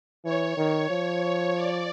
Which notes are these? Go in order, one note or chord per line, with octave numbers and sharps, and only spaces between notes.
E3 C#5
D#3
F3
D5